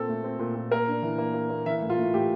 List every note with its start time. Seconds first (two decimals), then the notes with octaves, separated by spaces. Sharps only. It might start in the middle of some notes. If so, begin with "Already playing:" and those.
Already playing: A#2 C4 A4
0.08 A3
0.24 C4
0.39 A#2
0.56 A#2
0.71 A#3 A#4
0.87 D4
1.03 E3
1.18 A#3
1.34 A#3
1.50 A#3
1.66 E3 E5
1.82 A2
1.90 F4
1.98 A2
2.14 A2 G4